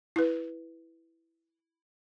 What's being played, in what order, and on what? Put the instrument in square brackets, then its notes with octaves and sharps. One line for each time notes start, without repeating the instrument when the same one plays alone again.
[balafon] E4 B4